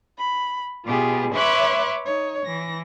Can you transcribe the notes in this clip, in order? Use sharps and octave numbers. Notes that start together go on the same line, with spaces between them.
B5
B2 B3 F4 G4 G#4
B4 C#5 E5 C6 D6 F#6
D#4 C#5
E3 A#6